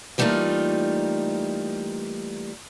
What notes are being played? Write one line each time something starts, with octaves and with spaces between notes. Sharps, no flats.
E3 G3 A3 A#3 D#4 F4